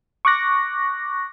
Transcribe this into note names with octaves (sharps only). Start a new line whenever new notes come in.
C#6 D6 F#6 A#6